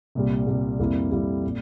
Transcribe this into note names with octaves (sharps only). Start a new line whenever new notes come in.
C2 A#2 G3
C2 A#2 G3
F2 C3 G3 A#3 E4
F2 C3 G3 A#3 E4
A#2